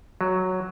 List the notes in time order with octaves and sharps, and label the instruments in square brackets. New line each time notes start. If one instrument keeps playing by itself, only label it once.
[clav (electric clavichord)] F#3